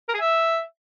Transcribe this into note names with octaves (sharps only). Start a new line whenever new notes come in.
A#4
G#4
E5